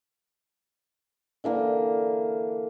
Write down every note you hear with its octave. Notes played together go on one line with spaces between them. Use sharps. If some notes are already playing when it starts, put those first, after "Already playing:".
D3 E3 A#3